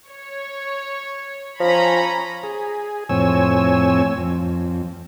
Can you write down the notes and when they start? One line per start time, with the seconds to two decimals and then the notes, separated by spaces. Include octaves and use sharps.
0.10 C#5
1.60 F3 C#4 A#5 B5
2.43 G#4
3.09 F2 A2 C4 C#5 G#5 E6
4.18 F2